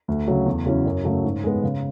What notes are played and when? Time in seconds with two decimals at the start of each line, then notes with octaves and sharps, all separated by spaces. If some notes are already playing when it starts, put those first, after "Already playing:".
0.08 D2
0.28 C#3 F#3
0.46 E2
0.65 C#3 F#3 C#4 E4
0.86 F#2
1.05 C#3 F#3 A3 C#4
1.24 G#2
1.44 G#3 B3
1.63 C#3